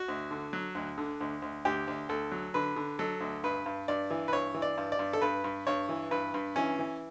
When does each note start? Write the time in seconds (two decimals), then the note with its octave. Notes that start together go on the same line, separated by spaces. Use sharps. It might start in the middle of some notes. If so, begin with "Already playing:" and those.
Already playing: F#4
0.08 D2
0.31 D3
0.53 F#3
0.75 D2
0.98 D3
1.21 D2
1.42 D2
1.65 D2 G4
1.88 D2
2.09 D2 A4
2.32 F#3
2.54 D3 B4
2.76 D3
2.99 F#3 A4
3.21 D2
3.44 G2 B4
3.66 G2
3.88 G2 D5
4.11 E3
4.28 B4
4.33 G2 C#5
4.54 E3
4.62 D5
4.78 G2
4.92 D5
4.99 G2
5.13 A4
5.21 G2 B4
5.44 G2
5.67 G2 C#5
5.89 E3
6.11 G2 B4
6.34 G2
6.56 E3 C#4
6.79 E3